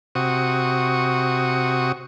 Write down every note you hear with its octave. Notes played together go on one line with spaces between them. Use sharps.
C3 F#4 C#6 D#6